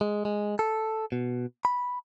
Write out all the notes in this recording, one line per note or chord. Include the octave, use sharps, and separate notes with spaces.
G#3
G#3
A4
B2
B5